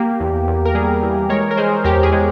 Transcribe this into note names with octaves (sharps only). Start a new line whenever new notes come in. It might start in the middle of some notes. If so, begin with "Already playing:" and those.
Already playing: A#3 G4
E2
E2
A#4
G3 G#4
E3
G#3 A#4 C#5
A#4
G#3 G#4 C5
E2 G4 A#4
G#4
G#3